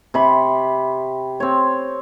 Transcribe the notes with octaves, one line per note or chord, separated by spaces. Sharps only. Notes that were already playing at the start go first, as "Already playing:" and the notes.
C3 B5 C#6
C4 C#5